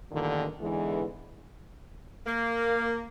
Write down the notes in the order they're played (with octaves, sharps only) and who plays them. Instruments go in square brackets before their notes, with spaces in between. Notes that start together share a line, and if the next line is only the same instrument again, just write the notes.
[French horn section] E2 G2 A#2 D3 D#3
E2 G#2 D3 E3 G#3 E4
[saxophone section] A#3